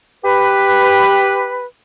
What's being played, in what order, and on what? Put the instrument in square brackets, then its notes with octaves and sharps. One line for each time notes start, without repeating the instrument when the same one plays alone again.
[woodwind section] G4 B4